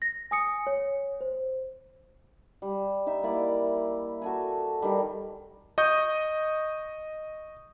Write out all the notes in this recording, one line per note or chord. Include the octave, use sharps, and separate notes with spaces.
A#6
G#5 D#6 C#7
C#5
C5
G3
D#4 E5
A#3 E4 D5
F#4 A4 G#5
D#3 G3
D#5 C#6 D#6 G6